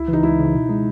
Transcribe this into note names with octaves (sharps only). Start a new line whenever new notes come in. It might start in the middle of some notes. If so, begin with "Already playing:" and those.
Already playing: C#2 E4
C#3 E3 D#4
C#2 E4
C#3 E3
B2
G#3 D#4